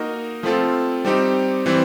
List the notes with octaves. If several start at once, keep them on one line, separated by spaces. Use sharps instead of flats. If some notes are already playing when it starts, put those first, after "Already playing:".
Already playing: A#3 D#4 F#4 A#4 D#5
F3 A3 C4 F4 A4
G3 C4 D#4 G4
E3 G3 C4